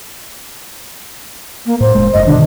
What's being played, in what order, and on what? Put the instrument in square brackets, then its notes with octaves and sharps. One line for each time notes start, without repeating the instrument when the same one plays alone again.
[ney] A#3
[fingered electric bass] A2 [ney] C5
[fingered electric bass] E1 G#3
[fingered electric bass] F#1 G#2 [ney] D#5
[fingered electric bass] B2 D3 D#3 [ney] D4